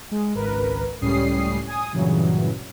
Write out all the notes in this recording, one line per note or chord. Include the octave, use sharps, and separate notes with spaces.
G#3
G#1 C#2 A#4 B4
C#2 A2 G3 C#4 D#6 C7
G#5 D#6
G2 A#2 C#3 E3 F#3